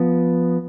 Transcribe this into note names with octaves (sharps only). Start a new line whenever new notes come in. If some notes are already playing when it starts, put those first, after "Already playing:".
Already playing: F3 B3